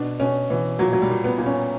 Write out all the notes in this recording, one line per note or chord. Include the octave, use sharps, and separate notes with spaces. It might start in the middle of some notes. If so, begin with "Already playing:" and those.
Already playing: B2 D4
B2 C#4
B2 E3
A#2 F#3
F#3
G3
A#2
B3
A#2
C#4